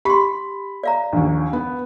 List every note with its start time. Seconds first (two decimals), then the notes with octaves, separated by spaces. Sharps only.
0.05 G4 B5 C6
0.83 D5 F5 A#5
1.12 A#1 D#2
1.53 B3